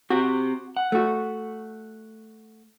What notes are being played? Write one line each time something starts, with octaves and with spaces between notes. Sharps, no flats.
C4 F#4 G4
F#5
A3 F#4